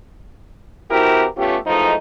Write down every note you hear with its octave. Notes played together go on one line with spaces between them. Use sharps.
E3 C4 E4 F#4 G4 A#4
A3 B3 C#4 F4 G4
G#2 E3 F3 A3 D#4